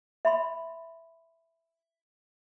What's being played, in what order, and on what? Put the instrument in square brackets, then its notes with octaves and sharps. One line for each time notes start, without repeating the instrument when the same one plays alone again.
[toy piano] E5 B5 C6